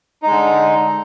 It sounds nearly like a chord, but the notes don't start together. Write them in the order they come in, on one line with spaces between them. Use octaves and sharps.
D#4 G#3 D3